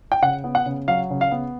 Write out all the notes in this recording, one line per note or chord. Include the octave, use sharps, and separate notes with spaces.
G5
C#3 F#5
B3
F#5
C#3
F#3 F5
C#3
F5
B3